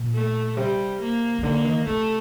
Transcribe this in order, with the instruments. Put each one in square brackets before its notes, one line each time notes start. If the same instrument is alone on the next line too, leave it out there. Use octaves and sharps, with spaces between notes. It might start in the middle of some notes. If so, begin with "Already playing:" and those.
Already playing: [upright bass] A#2
[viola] A3
[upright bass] C3 [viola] G3
[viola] A#3
[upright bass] C3
[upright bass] D3 [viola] A#3
[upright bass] D#3
[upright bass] C3 [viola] A3